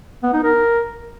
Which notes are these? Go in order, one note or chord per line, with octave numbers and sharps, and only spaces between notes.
B3
D#4
A#4